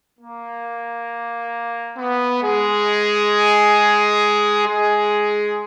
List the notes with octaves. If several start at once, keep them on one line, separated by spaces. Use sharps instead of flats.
A#3
B3
G#3 G#4
G#3 G#4